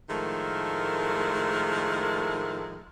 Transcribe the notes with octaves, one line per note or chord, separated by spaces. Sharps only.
A2 D#3 F3 G#3 A3 A#4